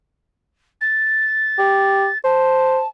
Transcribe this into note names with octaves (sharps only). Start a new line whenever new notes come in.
A6
G4
C5 A5